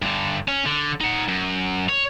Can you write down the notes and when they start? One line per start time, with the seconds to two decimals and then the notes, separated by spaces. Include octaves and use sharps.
0.02 G2 D3
0.48 C#4
0.66 D3
1.01 D#4 F#5
1.28 F#2
1.89 C#5